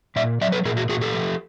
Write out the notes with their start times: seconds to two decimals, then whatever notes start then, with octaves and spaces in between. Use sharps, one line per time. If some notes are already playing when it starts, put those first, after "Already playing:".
0.16 A#2 D5 E5
0.41 F#3 D5 E5
0.52 A4 B4
0.65 A#2 G#4 A#4
0.77 F#4 G#4
0.89 A#2 F#4 G#4
1.01 G4 A4
1.14 F3